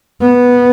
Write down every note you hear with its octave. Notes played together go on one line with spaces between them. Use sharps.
B3